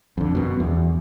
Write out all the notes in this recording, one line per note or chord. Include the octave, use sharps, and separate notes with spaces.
F2 D3
F#2 B2
E2